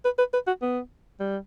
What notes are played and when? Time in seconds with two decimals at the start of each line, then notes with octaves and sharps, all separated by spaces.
0.05 B4
0.19 B4
0.34 B4
0.47 F#4
0.62 B3
1.20 G3